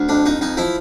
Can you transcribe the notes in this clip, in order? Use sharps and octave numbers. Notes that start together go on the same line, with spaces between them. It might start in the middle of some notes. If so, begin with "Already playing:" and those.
Already playing: D2
F2 D4
F2 D#4
F2 D#4
F3 E4